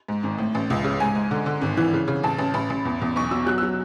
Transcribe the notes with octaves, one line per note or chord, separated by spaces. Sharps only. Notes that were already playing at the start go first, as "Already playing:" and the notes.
G#2
G#1
A2
A1
C#2
C#3
G#2 G#5
G#2
D3
D3
G#1
E3
C#3
C#3
A1 A5
A1
A1 B5
A1
E2
E2
B1 C#6
B2 E6
F#3 F#6
E6
F#3